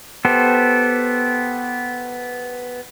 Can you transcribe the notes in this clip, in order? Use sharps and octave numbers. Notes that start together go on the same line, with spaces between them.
B3 G4 A4 C5